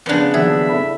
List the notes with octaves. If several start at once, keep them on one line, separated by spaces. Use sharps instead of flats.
C#3 F3 B3 D4
D#2 F3 F#3 G#4 E5
E4 A4 B5